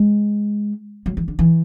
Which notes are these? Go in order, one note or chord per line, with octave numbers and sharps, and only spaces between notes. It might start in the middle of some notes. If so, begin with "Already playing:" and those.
Already playing: G#3
F#3
E3
D3
E3